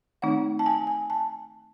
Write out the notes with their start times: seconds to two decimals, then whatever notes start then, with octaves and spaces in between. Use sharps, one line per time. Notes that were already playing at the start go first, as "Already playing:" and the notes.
0.22 D#3 A3 C4 D#4 F#5
0.59 A5
0.66 G#5
0.87 G#5
1.10 A5